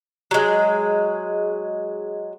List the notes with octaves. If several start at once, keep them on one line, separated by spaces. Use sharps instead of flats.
F#3 G#3